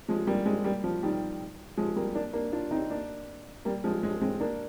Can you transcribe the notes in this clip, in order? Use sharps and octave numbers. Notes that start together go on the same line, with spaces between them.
F3 G#3
G3 A#3
G#3 C4
G3 A#3
F3
D#3 G3
F3 G#3
G3 A#3
A#3 D4
A#3 D4
D4 F4
C4 D#4
A#3 D4
G3 A#3
F3 G#3
G#3 C4
G#3 C4
A#3 D4